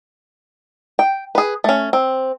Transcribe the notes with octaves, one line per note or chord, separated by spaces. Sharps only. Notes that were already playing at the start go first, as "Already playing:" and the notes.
G5
G#4 B4
A3 C#4
C4